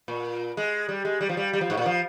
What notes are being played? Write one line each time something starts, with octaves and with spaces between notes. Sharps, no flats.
A#2
G#3
G3
G#3
G3
F3
G3
G3
F3
G#2
A#2
F3